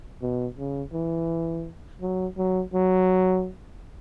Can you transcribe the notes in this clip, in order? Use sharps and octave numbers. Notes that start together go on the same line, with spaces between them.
B2
C#3
E3
F#3
F#3
F#3